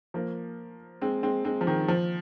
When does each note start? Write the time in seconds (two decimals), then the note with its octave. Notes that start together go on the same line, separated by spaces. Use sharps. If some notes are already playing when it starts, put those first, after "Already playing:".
0.14 F3 A#3
1.01 G#3 C4
1.23 G#3 C4
1.45 G#3 C4
1.61 F3
1.67 D#3
1.88 F3